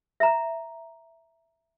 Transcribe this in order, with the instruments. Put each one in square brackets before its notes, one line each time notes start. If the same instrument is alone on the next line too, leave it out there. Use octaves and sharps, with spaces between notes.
[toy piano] E5 A#5